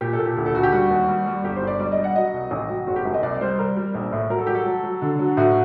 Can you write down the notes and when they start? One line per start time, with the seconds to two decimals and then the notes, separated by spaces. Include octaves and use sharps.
0.01 A#2 G4
0.13 A4
0.19 A#2
0.25 G4
0.36 D2 G4
0.46 A4
0.55 D2 F#4
0.63 G4
0.72 G3 F#4
0.90 D#2
1.08 G3
1.26 G3
1.44 G1 G4
1.56 C5
1.62 G2
1.67 D5
1.80 G3 D5
1.92 D#5
1.98 G3
2.04 F#5
2.16 F#3 D#5
2.33 C2
2.51 A1
2.69 F#3
2.87 F#1 F#4
2.96 G4
3.05 F#2
3.14 D#5
3.23 C2 D5
3.41 G3 C5
3.59 G3 A#4
3.76 G3
3.95 A#1
4.12 A2
4.30 F#3 A#4
4.39 A4
4.47 F#3 G4
4.55 A4
4.66 F#3
4.84 F#3
5.02 D3
5.19 F#3
5.37 A2 F#4